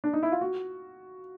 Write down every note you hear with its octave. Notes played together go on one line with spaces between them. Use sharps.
D4
D#4
E4
F4
F#4